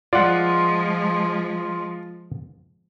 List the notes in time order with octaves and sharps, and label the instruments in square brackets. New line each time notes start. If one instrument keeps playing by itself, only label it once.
[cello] F3 G#3 [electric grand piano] F4 [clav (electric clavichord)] D5 F#5